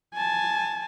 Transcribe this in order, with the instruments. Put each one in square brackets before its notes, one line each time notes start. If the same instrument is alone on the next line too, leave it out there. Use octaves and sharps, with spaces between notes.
[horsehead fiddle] G#5 A5